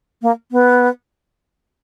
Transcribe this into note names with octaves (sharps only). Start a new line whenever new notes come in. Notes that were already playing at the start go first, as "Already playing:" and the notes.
A#3
B3